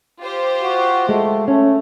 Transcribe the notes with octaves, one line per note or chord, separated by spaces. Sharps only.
F4 G4 C5
F#4
G#3 A3
A3 C#4